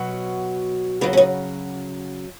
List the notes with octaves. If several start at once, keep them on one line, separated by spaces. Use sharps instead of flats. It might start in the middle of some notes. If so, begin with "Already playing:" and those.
Already playing: B2 F#3
C#3 F#3 B3 D#4
C#4
B3 D#4